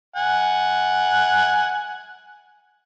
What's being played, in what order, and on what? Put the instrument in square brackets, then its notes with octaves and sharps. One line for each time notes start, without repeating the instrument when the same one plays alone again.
[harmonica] F#5 G#5